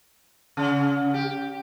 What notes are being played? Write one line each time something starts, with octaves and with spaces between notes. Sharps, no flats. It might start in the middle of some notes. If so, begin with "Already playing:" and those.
C#3
G4